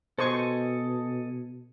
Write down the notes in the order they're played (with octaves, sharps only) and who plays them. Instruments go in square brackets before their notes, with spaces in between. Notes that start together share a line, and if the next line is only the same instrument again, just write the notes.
[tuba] B2 [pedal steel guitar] A4 D#5 G#5 [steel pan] C5 C#6